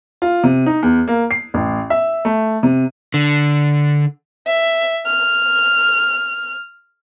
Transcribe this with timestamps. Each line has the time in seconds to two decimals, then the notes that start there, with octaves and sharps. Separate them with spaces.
0.22 F4
0.43 C3
0.66 D#4
0.83 E2
1.08 A#3
1.31 C7
1.54 A1
1.90 E5
2.25 A3
2.63 C3
3.14 D3
4.47 E5
5.06 F6